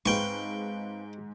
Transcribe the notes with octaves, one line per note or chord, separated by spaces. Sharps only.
G#2 G#3 C4 B4 F5 G5 C#6